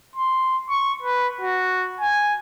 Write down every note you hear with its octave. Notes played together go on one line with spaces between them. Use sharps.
C6
C#6
B4
F#4
G#5